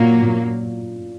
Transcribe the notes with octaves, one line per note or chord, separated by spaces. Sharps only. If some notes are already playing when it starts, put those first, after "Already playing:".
Already playing: A#2 F#3 A#3
A#2